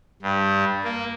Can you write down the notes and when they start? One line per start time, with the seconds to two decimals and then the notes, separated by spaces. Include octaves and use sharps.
0.22 G2
0.84 A#3